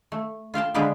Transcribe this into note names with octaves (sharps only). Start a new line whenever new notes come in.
A3
F4 F5 G5 A5
D3 G#3 B3 B4 D5 F5